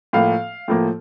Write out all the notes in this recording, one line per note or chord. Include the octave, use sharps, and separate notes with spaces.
A2 F3 A#3 F5
A2 F3 A#3